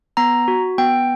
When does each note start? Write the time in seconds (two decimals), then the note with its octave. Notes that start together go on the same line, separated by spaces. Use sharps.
0.17 B3 A#5
0.48 F#4
0.78 B3 G5